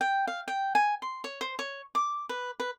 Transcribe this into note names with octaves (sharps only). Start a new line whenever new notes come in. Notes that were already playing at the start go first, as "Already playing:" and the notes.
G5
F5
G5
G#5
C6
C#5
C5
C#5
D6
B4
B4